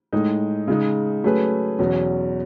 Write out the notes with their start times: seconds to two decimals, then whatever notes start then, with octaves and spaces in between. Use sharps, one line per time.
0.13 A2 G#3 D#4
0.68 C#3 G#3 D#4
1.24 F#3 A3 C#4 G#4 B4
1.79 E2 B2 F#3 C#4